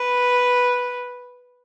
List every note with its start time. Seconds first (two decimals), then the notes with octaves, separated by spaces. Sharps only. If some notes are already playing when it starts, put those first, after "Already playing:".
Already playing: B4